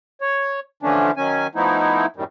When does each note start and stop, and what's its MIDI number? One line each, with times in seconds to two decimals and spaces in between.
0.21 0.60 73
0.83 1.11 50
0.83 1.11 52
0.83 1.11 53
0.83 1.11 57
0.83 1.11 61
0.83 1.11 62
1.17 1.47 51
1.17 1.47 54
1.17 1.47 61
1.17 1.47 80
1.55 2.06 53
1.55 2.06 57
1.55 2.06 59
1.55 2.06 63
1.55 2.06 64
2.16 2.24 42
2.16 2.24 45
2.16 2.24 51
2.16 2.24 55